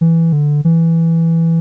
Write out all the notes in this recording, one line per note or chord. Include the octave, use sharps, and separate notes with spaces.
E3
D3
E3